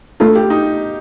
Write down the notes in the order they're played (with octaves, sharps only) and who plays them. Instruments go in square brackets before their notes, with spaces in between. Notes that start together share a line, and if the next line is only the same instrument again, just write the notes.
[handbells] A3 D4 A4 [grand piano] F4
[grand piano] G4
D#4